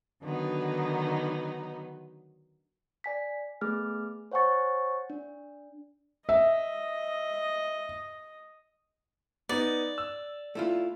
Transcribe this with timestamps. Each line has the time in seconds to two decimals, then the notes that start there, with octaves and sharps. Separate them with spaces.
0.22 D3 D#3 F#3 B3 D#4
3.04 D5 G#5 B6
3.61 A3 B3 G#4 D6 F6
4.32 C5 C#5 F#5 G#5 C#6 A6
5.10 D4
6.29 D#5 E5
9.49 B3 D#4 D5
9.98 E6
10.55 A3 E4 F4